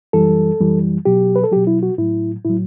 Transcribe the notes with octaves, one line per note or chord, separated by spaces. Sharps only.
F#2 E3 G3 A4
F#2 E3 G3
B2 F#3 G4
B4
A4
B2 F#3 G4
E4
F#4
A2 F#3 E4
A2 F#3 E4